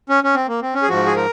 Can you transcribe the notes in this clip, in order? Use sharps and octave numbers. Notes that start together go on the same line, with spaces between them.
C#4
C#4
C4
A#3
C4
C#4
G#4
G#2 F3 F#4
G#4
A#4